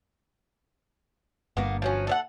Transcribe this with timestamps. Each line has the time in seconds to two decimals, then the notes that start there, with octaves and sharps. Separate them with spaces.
1.57 G1 G2 A#3 B3
1.82 F3 F#3 C#4
2.07 A4 C#5 F#5